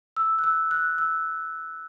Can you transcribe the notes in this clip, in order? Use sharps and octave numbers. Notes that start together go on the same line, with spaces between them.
E6
F#6
E6
F#6
E6